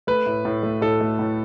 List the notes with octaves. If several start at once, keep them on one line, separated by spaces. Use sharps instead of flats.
A3 B4
A2
A2
A3
A2 A4
A3
A2